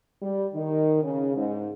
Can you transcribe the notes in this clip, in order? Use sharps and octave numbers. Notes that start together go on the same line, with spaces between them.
G3
D#3
C#3
G#2